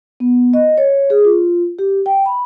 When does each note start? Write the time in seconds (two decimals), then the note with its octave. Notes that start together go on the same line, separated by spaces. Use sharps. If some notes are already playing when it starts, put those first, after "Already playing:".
0.20 B3
0.54 D#5
0.78 C#5
1.10 G#4
1.25 F4
1.79 G4
2.06 G5
2.26 B5